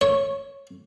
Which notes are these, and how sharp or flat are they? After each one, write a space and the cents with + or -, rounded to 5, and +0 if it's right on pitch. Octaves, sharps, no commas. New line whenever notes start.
C#5 -5